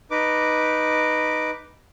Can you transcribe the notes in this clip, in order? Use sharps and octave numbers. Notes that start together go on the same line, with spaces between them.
D#4 B4 D6